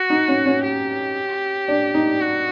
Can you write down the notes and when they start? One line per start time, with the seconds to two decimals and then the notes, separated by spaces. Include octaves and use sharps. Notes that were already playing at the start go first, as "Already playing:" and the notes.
Already playing: F#4
0.10 D#4
0.28 C#4
0.46 C#4
0.63 G4
1.68 D4
1.94 D#4
2.21 F#4